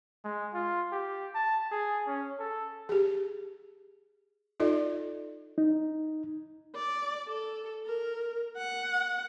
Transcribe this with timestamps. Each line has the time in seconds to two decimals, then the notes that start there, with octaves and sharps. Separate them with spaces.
0.25 G#3
0.54 F4
0.93 G4
1.35 A5
1.72 G#4
2.07 C#4
2.40 A4
2.89 G4 G#4
4.60 D#4 F4 A4 D5 D#5
5.58 D#4
6.76 D5
7.29 A4
7.86 A#4
8.57 F#5